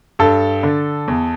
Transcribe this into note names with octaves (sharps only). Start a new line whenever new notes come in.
G2 A4
D3
E2